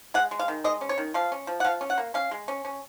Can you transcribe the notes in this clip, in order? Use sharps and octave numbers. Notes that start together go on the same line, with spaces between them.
G#3 F#5
G#3
F5
D#3
G#3 D#5
C#4
C#5
D#3
F3 F5
C#4
F3
F#5
F3 F5
C#4
F#5
A#3
C#4 F5
G#3
C#4
C#4